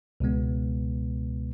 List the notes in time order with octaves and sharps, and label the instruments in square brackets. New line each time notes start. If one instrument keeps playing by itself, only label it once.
[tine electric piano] C#2 B2 G#3 B3